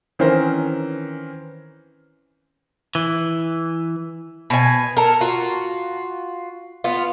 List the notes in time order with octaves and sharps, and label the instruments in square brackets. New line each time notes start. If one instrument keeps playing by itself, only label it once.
[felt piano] D#3 E3 C4 C#4 A#4 C5
[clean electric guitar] E3
[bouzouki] B2 G#5
A4 A#4
F4 F#4
B3 F4